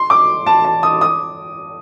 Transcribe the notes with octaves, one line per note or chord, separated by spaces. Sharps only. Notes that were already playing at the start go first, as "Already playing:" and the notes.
Already playing: C6
D6
A5
A5
D#6
D#6